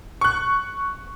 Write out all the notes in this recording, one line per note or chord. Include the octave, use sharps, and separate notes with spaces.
C#6 F#6